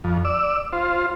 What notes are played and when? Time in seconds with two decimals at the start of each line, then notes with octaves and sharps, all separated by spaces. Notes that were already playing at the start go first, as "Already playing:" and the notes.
0.04 F2
0.25 D5 E6
0.73 F4 C5